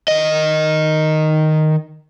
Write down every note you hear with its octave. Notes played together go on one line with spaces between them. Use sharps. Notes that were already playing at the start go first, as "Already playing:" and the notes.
D#3 D#5